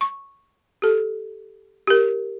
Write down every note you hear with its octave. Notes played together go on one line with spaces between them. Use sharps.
C#6
G4 A4
G4 A#4